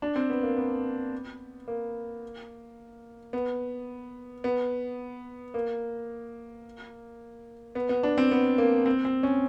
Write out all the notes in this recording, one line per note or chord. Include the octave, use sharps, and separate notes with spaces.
D4
C4
B3
A#3
B3
A#3
B3
B3
A#3
B3
B3
D4
C4
B3
A#3
C4
C4
C#4